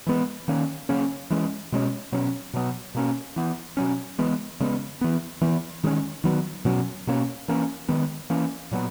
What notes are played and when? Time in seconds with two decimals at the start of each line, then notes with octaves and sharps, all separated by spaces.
0.07 E3 G#3 B3
0.48 D#3 A#3 C#4
0.89 C#3 F#3 A#3 C#4
1.30 E3 G#3 C#4
1.72 B2 G#3 C#4
2.12 B2 F#3 C#4
2.54 B2 F#3 B3
2.95 B2 A#3 C#4
3.36 E3 B3
3.77 B2 F#3 C#4
4.19 C#3 E3 G#3 B3
4.60 C#3 G#3 B3
5.01 E3 B3
5.41 E3 B3
5.84 D#3 G#3 C#4
6.24 D#3 F#3 B3
6.65 B2 F#3 C#4
7.07 B2 A#3 C#4
7.48 E3 A#3 C#4
7.89 D#3 G#3 B3
8.30 E3 A#3 C#4
8.71 A#2 F#3 B3